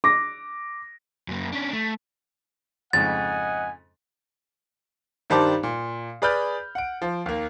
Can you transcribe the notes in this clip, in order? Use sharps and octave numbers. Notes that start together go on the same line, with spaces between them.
D6 A#6
F#2 A#3
C#4 D4
A3
F2 G#2 C#3 D#5 F#5 G#5 A6
G2 D#3 G3 C5 A5 D6
A#2
G#4 B4 D5 B5 F6 G6
F#5 D7
F3
D#2 A#3